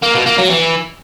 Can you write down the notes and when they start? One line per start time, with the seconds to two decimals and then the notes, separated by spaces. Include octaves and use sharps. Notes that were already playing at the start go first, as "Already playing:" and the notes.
0.03 A#3
0.15 B2
0.26 A#3
0.38 F#3
0.50 E3